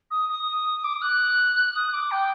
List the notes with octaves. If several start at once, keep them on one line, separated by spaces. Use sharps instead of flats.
D#6
D#6
D6
D#6
F#6
D#6
D6
G5